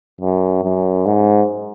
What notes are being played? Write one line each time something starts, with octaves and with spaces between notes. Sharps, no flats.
F#2
F#2
G#2